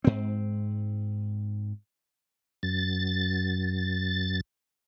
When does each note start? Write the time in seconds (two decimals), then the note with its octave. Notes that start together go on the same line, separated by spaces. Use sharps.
0.04 G#2 C4
2.63 F#2 A6